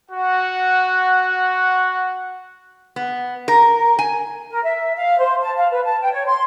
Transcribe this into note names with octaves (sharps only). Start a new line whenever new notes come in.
F#4 F#5
B3
A#4
G#5
A#4
E5
F5
C5
A5
F5
B4
A5
G5
C#5
C6